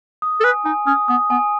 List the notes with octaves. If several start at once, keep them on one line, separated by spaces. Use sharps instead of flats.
D#6
A4
B4 G#5
D#4 G#5
C#4 D#6
B3 D#6
B3 G#5